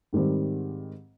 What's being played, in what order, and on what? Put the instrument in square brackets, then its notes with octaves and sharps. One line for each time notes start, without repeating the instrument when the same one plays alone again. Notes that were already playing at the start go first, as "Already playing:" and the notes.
[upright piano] G#2 D#3 G3 C4